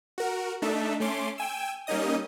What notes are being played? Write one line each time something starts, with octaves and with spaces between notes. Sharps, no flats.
F#4 A#4
A3 D4 D#4 A4 E5
A3 C#4 C6 D6
G5 G#5 E6
G3 A#3 C#4 D#4 D#5 D#6